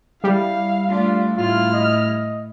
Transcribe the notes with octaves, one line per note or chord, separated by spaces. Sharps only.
G3 E4 F5
A3 D4 F4
A2 E4 F4 F6
D#5